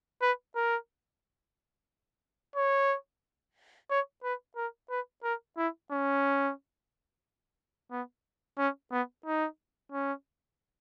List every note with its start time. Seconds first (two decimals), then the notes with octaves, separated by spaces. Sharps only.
0.22 B4
0.56 A#4
2.56 C#5
3.90 C#5
4.23 B4
4.56 A#4
4.90 B4
5.24 A#4
5.58 E4
5.92 C#4
7.92 B3
8.58 C#4
8.92 B3
9.26 D#4
9.92 C#4